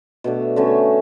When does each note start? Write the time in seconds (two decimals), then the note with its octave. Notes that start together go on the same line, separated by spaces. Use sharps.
0.24 B2 A3 D4
0.56 D3 A3 C#4